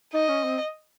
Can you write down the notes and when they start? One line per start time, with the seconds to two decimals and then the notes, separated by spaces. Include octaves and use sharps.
0.14 D#4 D#5
0.29 C#4
0.44 C4